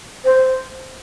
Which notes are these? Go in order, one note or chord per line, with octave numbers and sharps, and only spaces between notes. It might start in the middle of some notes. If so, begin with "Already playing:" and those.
C5